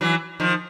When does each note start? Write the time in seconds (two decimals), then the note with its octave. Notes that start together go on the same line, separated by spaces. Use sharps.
0.01 E3 F#3
0.40 D#3 F3